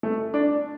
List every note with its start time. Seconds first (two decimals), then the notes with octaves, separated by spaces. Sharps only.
0.03 A3
0.34 D4